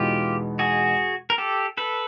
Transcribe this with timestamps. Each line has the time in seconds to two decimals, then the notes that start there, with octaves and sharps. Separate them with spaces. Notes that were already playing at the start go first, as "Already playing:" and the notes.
Already playing: E2 B2 G#3 B3 D#4 F4 G4
0.59 F#4 G#4
1.30 A#4
1.38 G4 A4
1.77 A4 B4